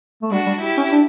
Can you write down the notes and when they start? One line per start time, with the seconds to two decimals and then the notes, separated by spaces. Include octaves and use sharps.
0.22 A3
0.31 G3 D4 F#4
0.46 G3
0.62 E4 G4
0.77 C#4
0.92 D4